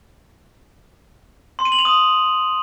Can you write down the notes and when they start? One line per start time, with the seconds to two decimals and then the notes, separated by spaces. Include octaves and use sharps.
1.59 C6
1.65 D#7
1.72 F#7
1.79 F7
1.85 D#6